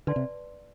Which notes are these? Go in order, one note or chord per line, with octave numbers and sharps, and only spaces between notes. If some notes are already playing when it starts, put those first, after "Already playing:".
D3 B4 D5 A5 C6
C3